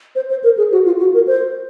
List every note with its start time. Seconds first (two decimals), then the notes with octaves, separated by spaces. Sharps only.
0.15 C5
0.30 C5
0.43 A#4
0.57 G#4
0.72 F#4
0.85 F4
0.99 F#4
1.14 A#4
1.27 C5